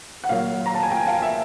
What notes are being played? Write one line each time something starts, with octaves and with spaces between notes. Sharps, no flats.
F#5
A#2 F#3 F5
A#5
A5
G#5
G5
F5
E5